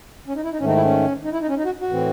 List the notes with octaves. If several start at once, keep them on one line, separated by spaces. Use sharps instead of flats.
C#4
D#4
E4
D#4
G#2 D#3 A3 C#4
D#4
E4
C#4
D#4
E4
D#4
C#4
D#4
F#4
F#4
A2 E3 C4